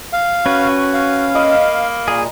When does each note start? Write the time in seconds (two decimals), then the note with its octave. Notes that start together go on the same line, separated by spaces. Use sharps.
0.13 F5
0.46 C#4 F#4 B4
0.94 F5
1.35 A#3 D#5 B5
2.08 A#2 G#4 A#5